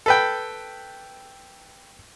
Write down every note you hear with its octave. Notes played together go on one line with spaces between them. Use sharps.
A4 B4 G5